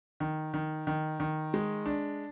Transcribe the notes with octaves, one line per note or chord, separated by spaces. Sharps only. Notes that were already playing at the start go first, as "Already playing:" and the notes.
D#3
D#3
D#3
D#3
G#3
D4